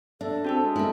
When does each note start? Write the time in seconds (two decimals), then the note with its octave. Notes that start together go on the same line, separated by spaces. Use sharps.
0.21 D4 A4 E5
0.45 C4 F#4 G#4 A5
0.60 G#3
0.76 A#3 C4 E4 A4